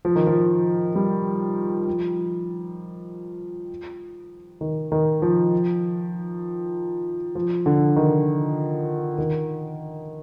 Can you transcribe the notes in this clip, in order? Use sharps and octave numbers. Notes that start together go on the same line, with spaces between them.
F3
D#3
F3
G3
F3
D#3
D#3
F3
F3
D3
D#3
D#3